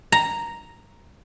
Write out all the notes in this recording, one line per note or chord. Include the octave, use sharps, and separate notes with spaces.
A#5